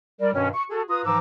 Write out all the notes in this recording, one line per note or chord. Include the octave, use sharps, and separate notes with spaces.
G3 A#4 D5
G2 B2 D#3 C#4
C#6
F#4 G#4 A4
F4 B4 A#5 D#6
G#2 E3 F3 A#5 D6 E6